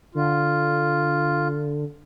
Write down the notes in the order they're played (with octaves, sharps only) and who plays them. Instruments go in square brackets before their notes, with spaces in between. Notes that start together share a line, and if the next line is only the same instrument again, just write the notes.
[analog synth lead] D3 [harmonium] F4